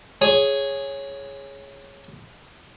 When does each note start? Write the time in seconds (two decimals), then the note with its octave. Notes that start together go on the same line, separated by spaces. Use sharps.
0.21 G#4 C#5